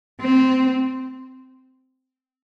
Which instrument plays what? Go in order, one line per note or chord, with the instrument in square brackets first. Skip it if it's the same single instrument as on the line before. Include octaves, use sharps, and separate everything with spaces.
[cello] C4